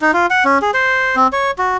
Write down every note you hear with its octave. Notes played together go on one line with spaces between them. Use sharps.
D#4
F4
F#5
C#4
G#4
C5
C4
C#5
F#4